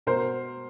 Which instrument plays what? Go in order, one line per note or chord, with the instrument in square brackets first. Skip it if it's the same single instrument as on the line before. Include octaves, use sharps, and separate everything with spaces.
[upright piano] B2 A#4 C5